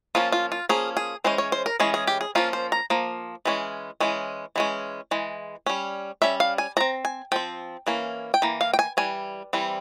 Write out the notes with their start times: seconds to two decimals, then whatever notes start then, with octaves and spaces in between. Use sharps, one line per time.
0.15 F3 A#3 C#4 F4
0.32 F4
0.52 F4
0.69 F3 A#3 C#4 G#4
0.97 G#4
1.24 E3 G#3 C#4 C5
1.38 C#5
1.52 C5
1.66 A#4
1.80 E3 G#3 C#4 G#4
1.94 G#4
2.07 G4
2.21 G#4
2.35 F3 A#3 C#4 F4
2.53 C5
2.72 A#5
2.90 F3 A#3
3.45 E3 G#3 C#4
4.00 E3 G#3 C#4
4.56 E3 G#3 C#4
5.11 E3 G#3
5.66 G3 C#4
6.22 G3 C#4 E5
6.40 F5
6.58 G#5
6.77 F3 A#5
6.80 C4
7.05 G#5
7.32 F3 C4 G5
7.87 E3 A#3 C#4
8.34 G5
8.42 E3 A#3
8.61 F5
8.74 G5
8.79 G#5
8.97 E3 G3 G#5
9.53 E3 G3 C4